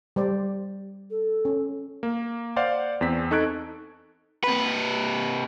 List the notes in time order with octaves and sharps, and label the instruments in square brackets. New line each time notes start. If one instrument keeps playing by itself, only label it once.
[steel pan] G3 C5 D5
[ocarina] A4
[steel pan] C#4
[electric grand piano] A#3
C5 D5 F5 F#5
E2 C4 B6
D#4 A4 C#6 F#6 G#6 D7
[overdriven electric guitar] C3 B4